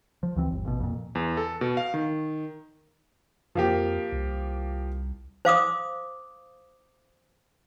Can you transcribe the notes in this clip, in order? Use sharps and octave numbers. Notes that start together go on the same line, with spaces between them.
F3
D2 E3 C4
G1
A1 B2
F2 A#2
E2
A4
B2
F5
D#3
F2 F3 A#3 G4
C2
C5 F5 D6 D#6